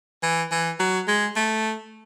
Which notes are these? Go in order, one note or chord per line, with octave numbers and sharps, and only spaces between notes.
E3
E3
F#3
G#3
A3